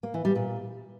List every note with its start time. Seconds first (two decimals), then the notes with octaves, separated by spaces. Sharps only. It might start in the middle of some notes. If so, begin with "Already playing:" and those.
0.03 A#3
0.14 E3
0.25 G3
0.35 A#2